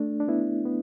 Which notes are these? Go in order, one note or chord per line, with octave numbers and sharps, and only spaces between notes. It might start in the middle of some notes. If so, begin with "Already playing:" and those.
Already playing: A3 D4
D4
B3 E4
B3